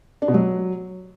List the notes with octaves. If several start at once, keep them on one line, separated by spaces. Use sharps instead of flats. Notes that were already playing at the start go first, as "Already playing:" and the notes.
D4
B2
F#3